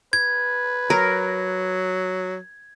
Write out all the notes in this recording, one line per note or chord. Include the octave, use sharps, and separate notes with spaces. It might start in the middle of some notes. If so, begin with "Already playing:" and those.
B4 G#6
F#3 A#4